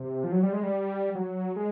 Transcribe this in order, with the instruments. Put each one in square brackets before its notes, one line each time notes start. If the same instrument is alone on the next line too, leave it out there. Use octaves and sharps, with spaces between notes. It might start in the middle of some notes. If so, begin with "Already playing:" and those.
Already playing: [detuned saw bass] C3
F3
F#3
G3
G#3
G3
F#3
G#3